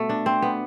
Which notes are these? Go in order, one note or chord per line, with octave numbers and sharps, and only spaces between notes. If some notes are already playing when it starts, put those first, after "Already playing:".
Already playing: B2 A3 B3
D4
C4
B3